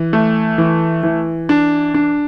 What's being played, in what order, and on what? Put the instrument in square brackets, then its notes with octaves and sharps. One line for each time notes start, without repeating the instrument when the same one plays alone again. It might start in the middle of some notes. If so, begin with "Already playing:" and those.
Already playing: [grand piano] E3
A3
E3
E3
D4
D4